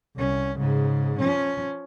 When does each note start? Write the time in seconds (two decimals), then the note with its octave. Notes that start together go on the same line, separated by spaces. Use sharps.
0.16 C2 C#4
0.58 G#2 C#3
1.19 F3 C#4